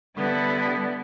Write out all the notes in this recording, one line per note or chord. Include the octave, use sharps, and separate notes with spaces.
D3 G3 B3 E4